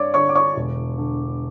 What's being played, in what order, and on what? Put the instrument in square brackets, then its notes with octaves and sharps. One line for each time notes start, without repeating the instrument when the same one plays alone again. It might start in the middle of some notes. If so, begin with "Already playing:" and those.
Already playing: [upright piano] G2 C#5 D5 D6
D3 C#5 C#6
D6
C#5 C#6
E1
D3